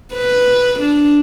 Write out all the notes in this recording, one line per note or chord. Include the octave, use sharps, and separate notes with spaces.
B4
D4